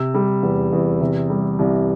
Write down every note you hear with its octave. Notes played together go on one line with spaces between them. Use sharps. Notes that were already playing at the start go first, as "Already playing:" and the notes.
Already playing: C3 E6
G3
E2
E2
C3
G3
C2